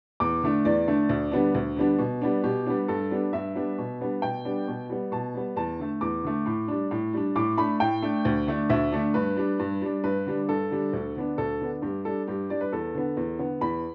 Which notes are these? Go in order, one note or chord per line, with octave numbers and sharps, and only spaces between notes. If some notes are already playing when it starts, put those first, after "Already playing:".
E2 D6
D3 A3 D4
E2 D5
D3 A3 D4
D2
D3 G3 B3 D4
D2
D3 G3 B3 D4
B2
G3 B3 D4
B2 G4
G3 B3 D4
G2 A4
G3 B3 D4
G2 E5
G3 B3 D4
B2
G3 B3 D4
B2 G5
G3 B3 D4
B2
G3 B3
B2 A5
G3 B3
E2 A5
D3 A3
E2 D6
D3 A3
A2
G3 D4
A2
G3 D4
A2 D6
A3 D4 B5
A2 G5
A3 D4
D2
D3 A3 D4
D2 E5
D3 A3 D4
G2 B4
G3 D4
G2
G3 D4
G2 B4
D3 G3 D4
G2 A4
D3 G3 D4
D2
D3 B3 D4
D2 A4
D3 B3 D4
G2 G4
G3 D4 A4
G2 G4
G3 D4 D5
B4
E2 A4
D3 B3
E2
D3 B3
E2 B5